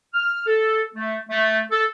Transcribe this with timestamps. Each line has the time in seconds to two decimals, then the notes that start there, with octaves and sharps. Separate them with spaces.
0.14 F6
0.47 A4
0.94 A3
1.30 A3
1.71 A4